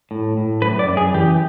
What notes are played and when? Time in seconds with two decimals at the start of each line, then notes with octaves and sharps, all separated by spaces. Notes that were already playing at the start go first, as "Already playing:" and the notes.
0.11 A2
0.37 A2
0.62 F#2 B4
0.79 D5
0.88 F#2
0.97 G#4
1.14 E3 G4